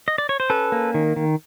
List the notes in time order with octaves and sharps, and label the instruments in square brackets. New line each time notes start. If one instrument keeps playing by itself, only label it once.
[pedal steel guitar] D#5
D5
C#5
C5
C#4 A4 B4
A#3
D#3
D#3